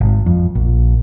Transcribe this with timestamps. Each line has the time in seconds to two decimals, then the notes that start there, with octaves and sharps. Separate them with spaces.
0.01 G#1
0.26 F2
0.55 A#1